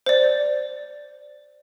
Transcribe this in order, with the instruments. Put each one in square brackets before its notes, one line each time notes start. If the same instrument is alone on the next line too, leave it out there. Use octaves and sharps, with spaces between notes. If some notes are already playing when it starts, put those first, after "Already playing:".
[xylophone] C5 D5